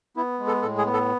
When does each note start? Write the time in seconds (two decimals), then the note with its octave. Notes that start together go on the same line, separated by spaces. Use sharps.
0.16 B3 E4
0.39 G#3
0.47 A4
0.62 A2 A4
0.78 G#4
0.86 B3
0.93 A4